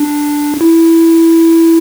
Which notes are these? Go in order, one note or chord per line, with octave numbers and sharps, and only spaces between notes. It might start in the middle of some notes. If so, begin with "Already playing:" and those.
Already playing: D4
E4